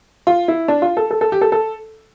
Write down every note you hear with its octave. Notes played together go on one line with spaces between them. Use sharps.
F4
E4
D4
F4
A4
A4
A4
G4
A4
A4